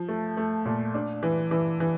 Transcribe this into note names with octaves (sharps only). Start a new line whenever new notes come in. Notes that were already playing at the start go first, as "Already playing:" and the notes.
Already playing: F3
A3
A3
A#2
D4
E3
E3
E3